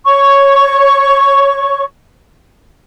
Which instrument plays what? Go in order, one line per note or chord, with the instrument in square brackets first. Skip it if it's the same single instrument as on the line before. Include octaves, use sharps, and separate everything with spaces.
[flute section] C#5 C#6